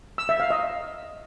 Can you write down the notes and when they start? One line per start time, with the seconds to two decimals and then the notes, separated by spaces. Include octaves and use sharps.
0.18 E6
0.29 E5
0.40 F5
0.50 D#5